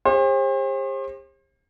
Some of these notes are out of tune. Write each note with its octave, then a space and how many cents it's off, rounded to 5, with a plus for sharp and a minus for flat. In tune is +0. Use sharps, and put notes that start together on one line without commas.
G4 +45 C5 +40